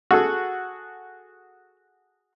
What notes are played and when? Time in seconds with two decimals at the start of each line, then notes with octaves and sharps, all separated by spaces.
0.11 F#4 G#4 A4